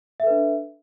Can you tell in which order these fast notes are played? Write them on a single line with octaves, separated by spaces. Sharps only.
E5 A4 B4 D4